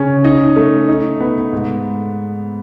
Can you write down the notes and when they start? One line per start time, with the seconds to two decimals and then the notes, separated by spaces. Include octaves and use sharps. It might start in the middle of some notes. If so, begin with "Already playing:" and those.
Already playing: C#3 C#4
0.24 D#4 D#5
0.56 A3
0.88 D#4
1.20 B3
1.52 G#2